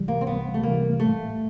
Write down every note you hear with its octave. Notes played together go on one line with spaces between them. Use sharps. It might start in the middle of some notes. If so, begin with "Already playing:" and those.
Already playing: C#2 C3 E3 G3
A#3
C4
C#2 B3
A3
C3 E3 G3 A#3
A2 A3